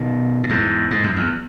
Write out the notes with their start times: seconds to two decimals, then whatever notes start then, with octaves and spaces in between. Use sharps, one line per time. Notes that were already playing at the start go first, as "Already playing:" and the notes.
Already playing: B2 D#3
0.43 A2
0.49 E2 G#2
0.91 G#2
1.04 F#2
1.16 E2